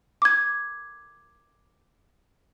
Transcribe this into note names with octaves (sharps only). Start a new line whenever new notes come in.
D6 G#6